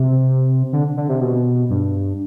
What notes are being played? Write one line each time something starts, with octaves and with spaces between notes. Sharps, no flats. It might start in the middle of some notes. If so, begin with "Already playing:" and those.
Already playing: C3
D3
D3
C3
B2
G2